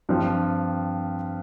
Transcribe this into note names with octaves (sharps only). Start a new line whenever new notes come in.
G2 F3 C4 F4